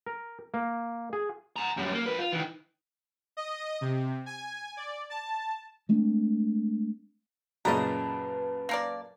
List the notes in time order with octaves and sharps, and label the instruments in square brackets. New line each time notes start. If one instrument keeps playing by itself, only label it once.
[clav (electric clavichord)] A#4
A#3
G#4
[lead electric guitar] G#5 A#5
F#2 G3
A#3
F3 B4
F4
D#3 E3
[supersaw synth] D#5
C3
G#5
D5
A5
[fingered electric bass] G#3 A3 C4 D4
[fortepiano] F#2 A#2 C#3 [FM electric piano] B4 A5 [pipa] D#5 A#5
[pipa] A#3 A#4 D5